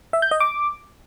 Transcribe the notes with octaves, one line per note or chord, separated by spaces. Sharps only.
E5
G6
D#5
D6